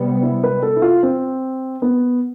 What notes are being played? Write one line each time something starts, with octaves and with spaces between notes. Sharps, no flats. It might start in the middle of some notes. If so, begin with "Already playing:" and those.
Already playing: C3 G3 B3
E4
B4
A4
E4
F4
C4
B3